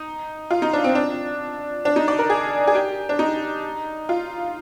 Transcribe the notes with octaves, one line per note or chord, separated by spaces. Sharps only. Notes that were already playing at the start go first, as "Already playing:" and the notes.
Already playing: D#4
F4
D#4
D4
C4
D4
D4
D#4
D5
A#4
G#4
G#4
G4
D4
D#4
F4